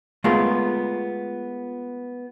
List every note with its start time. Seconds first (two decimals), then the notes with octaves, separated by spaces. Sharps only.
0.24 G#3 A3 B3 F4 G#4 A#4